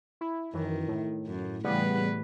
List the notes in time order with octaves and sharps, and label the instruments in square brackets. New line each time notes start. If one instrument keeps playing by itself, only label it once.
[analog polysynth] E4
[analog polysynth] F#2 E3 [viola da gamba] D#3
[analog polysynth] A2
[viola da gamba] F#2
[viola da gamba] A2 E3 B4 [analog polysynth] C#3 G3 B3